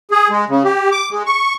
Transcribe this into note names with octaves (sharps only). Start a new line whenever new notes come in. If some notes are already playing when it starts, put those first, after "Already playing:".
G#4
G#3
C#3
G4
D6
G#3
C#6